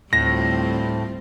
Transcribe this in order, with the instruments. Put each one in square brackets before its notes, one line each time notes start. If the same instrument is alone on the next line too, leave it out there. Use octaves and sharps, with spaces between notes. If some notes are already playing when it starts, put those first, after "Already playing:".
[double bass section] D2 [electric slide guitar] A2 [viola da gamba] G3 C4 F4 [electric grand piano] A#6